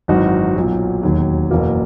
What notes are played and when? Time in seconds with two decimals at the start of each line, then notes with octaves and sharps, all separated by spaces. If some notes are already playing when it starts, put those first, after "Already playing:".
0.08 G#1 F#2 E3 D#4 F#4
0.56 B1 A#2 F#3
1.03 E1 D#2 D#3 F#3
1.51 F#1 E2 B2 A#3